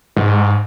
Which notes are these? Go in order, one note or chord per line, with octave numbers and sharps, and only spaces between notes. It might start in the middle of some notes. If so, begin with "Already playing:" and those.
G#2